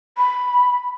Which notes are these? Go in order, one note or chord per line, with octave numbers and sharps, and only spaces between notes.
B5